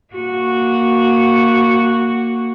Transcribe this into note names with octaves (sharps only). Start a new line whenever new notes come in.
A#3 F#4